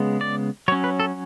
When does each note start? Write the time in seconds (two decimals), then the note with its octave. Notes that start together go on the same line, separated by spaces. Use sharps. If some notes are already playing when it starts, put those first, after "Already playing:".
Already playing: C#3 G#3 B3
0.21 D5
0.68 F#3 C#5
0.72 C#4
0.84 B4
1.00 A4